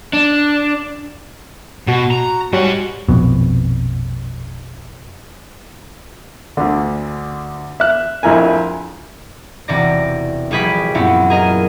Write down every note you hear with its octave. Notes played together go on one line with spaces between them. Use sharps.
D4
B2 F#4
A#5
G#2 G3 F#4 C#5 F#5
A#1 F2 B2
D2 D3
E5 F#6
A#1 F2 E4 A#4 G#5
E1 C3 D5 A#6
A#1 G3 G4 G#4 B4 B6
F#2 A#2 B3 C4 E4
G#4 A#4 D#5